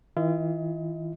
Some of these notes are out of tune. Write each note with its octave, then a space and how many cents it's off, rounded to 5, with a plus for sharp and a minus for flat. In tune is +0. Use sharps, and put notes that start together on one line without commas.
E3 -40 F4 -40 D#5 +30